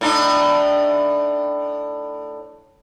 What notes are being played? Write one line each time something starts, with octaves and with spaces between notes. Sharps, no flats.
A2 D4 D#4